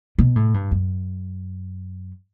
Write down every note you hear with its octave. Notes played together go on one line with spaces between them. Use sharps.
B2
A2
G2
F#2